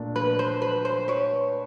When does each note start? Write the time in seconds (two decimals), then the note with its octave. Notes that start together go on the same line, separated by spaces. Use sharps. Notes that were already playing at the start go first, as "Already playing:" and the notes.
Already playing: A#2 A3 D4
0.16 B4
0.39 C5
0.62 B4
0.85 C5
1.08 B4 C#5